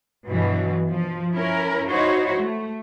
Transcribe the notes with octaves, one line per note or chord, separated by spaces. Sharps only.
G2 B2 E3 F#3
F3
C#4 E4 A#4
D#4 E4 F#4 C5 C#5
A3